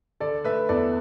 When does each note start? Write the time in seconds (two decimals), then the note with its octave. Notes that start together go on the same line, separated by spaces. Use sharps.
0.20 D3 A4 D5
0.44 A3 B4 E5
0.69 E2 A4 D5